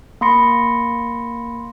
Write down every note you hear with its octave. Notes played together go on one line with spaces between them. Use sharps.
A#3 B5 C6 A#6 C#7